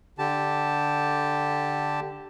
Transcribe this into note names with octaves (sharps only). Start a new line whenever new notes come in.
D3 G4 A5